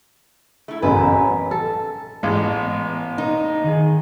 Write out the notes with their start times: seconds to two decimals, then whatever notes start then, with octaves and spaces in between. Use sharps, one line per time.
0.68 A3 E4
0.82 A1 F#2 C#3 B4 G#5 A#5
1.51 A4
2.23 A1 G#2 G#3
2.43 B3
3.18 D#4
3.64 D#3 G#4